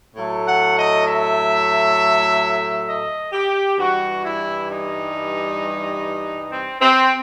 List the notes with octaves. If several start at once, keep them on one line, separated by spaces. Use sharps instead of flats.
A2 F#3 A3
F#5
D#5
E5
D#5
G4
G2 E3 G3 F#4
E4
D#4
C4
C4